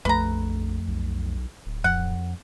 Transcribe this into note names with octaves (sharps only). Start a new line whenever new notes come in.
A#1 F2 A3 B4 A#5
B1
D1
F2 F#5